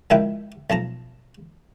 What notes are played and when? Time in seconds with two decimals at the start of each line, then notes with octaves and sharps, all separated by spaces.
0.10 C#2 D#3 F3 E4 B4 G5
0.70 B1 F3 A5 A#5